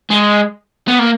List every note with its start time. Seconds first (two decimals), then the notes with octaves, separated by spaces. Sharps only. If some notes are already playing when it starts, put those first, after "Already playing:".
0.10 G#3
0.88 B3
0.99 A#3